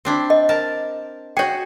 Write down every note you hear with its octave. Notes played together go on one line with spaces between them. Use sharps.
C4 D4 E4
D#5
A#4 A5
F#4 G#4 C#5 G5